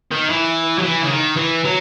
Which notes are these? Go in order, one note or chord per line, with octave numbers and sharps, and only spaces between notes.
D#3
E3
F#3
E3
C#3
D#3
E3
F#3